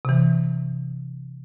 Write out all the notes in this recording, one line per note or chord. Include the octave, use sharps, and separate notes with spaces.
C3 E3